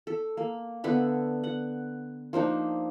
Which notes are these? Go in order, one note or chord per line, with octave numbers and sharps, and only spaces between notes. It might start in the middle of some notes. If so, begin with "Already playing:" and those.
A4
A#3
D3 B3 E5
F#5
F3 A#3 D4 D#4